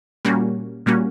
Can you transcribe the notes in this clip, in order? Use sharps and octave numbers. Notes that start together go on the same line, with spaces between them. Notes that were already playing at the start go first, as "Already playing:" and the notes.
A#2 G3 A#3 C#4 F#4
A#2 G3 A#3 C#4 F#4